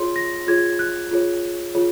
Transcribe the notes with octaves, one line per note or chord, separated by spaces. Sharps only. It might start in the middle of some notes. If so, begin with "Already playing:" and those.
Already playing: F4 G#4 C#5 C6
A#6
F4 G#4 C#5 G#6
F#6
F4 G#4 C#5
F4 G#4 C#5